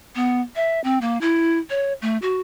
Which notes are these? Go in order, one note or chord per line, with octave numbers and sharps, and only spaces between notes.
B3
E5
C4
A#3
E4
C#5
A3
F#4